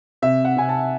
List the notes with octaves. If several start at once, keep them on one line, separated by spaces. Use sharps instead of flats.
C3 E5
F#5
C3 G#5
A5